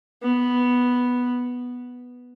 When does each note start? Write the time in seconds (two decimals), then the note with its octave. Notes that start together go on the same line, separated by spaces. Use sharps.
0.23 B3